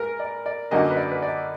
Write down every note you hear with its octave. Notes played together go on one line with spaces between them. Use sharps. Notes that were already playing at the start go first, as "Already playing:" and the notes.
Already playing: G#2 A#4 B4
D5
D5
F#2 D3 F#3 A#3 D#5
B4
D5
B4
D5